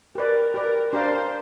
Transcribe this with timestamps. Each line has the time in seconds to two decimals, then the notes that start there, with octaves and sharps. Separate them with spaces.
0.15 G4 A#4 B4 D5
0.54 G4 A#4 B4 D5
0.92 D4 G4 A#4 C5 D5 F5